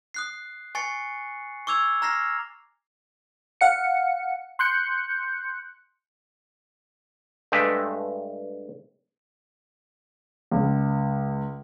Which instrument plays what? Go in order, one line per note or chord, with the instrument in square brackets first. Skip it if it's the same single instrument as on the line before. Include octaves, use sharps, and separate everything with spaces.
[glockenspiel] D#6 F#6 C7
G#5 C#6 A6 C7 C#7
C#6 D6 E6 G#6 F7
A#5 F6 A#6 C7
[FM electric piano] F5 F#5 C#7
C6 F#6 G6 C#7
[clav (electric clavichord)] G2 G#3 A3 G4 B4 E5
[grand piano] C#2